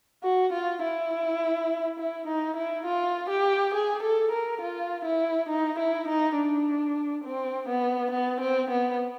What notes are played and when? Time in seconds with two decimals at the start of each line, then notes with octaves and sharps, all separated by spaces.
0.23 F#4
0.53 F4
0.83 E4
1.99 E4
2.28 D#4
2.57 E4
2.86 F4
3.30 G4
3.75 G#4
4.03 A4
4.32 A#4
4.62 F4
5.05 E4
5.49 D#4
5.79 E4
6.08 D#4
6.37 D4
7.24 C4
7.69 B3
8.12 B3
8.41 C4
8.71 B3